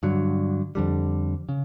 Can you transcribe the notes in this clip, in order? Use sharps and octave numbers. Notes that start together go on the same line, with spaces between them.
G2 D3 F#3
F2 D3 G3
C#3